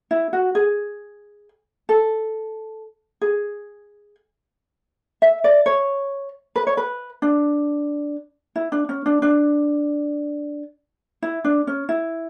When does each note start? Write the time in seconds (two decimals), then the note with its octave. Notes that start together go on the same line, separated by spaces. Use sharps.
0.11 E4
0.33 F#4
0.55 G#4
1.89 A4
3.21 G#4
5.22 E5
5.44 D5
5.66 C#5
6.56 B4
6.67 C#5
6.77 B4
7.22 D4
8.56 E4
8.72 D4
8.89 C#4
9.06 D4
9.22 D4
11.22 E4
11.44 D4
11.67 C#4
11.89 E4